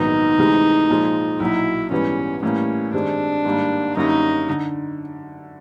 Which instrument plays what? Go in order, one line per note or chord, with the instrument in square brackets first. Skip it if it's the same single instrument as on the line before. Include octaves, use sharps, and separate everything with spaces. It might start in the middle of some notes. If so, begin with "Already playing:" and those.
Already playing: [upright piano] A#1 G#2 D#3 F#3 B3 [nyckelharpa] D#4
[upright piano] D2 C3 E3 G#3
A#2 F3 G#3
[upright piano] B1 A#2 F#3 [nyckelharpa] E4
[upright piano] G#2 E3 G3 B3 [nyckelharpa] C#4
[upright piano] A2 E3 G3 A#3 [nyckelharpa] C#4
[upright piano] G2 D#3 G#3 C4 [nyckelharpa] D4
[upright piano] G#2 D#3 G3 A#3
[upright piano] F#2 D3 G3 A#3 C#4 [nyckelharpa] D#4
[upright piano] D3